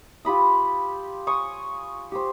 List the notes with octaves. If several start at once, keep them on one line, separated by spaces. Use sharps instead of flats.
F4 G4 B5 D#6
G#5 C#6 D#6
G4 C5